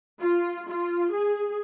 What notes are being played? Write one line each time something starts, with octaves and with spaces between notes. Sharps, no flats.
F4
F4
G#4